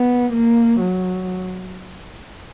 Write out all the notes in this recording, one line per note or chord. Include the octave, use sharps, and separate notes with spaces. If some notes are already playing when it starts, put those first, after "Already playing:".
Already playing: B3
A#3
F#3